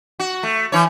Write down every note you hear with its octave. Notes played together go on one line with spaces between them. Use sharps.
F#4
A3
E3 C#5